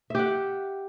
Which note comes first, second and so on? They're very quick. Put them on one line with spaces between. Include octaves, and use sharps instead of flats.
E5 G4 F#5